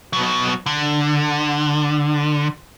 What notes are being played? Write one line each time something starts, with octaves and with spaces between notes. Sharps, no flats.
B2 F#3
D3